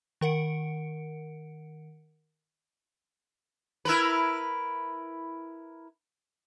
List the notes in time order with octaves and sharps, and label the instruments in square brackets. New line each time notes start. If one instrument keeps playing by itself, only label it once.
[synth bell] D#3 A#4 F#5 C#7 D7
[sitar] E4 A#4 B4